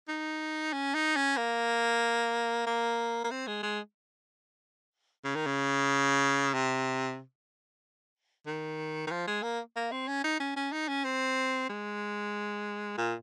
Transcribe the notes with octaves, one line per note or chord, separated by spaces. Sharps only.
D#4
C#4
D#4
C#4
A#3
A#3
A#3
C4
G#3
G#3
C#3
D#3
C#3
C3
D#3
D#3
F3
G#3
A#3
A#3
C4
C#4
D#4
C#4
C#4
D#4
C#4
C4
G#3
A#2